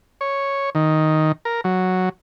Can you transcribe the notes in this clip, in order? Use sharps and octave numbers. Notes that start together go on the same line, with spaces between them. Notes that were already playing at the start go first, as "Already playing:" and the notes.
C#5
D#3
A#4
F#3